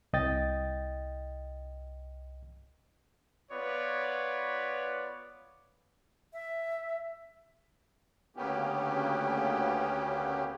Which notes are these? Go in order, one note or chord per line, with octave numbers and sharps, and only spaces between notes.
C2 D#5 G5 A6
B3 F4 B4 C#5 D5
E5
D2 C#3 A#3 B3 C#4 G4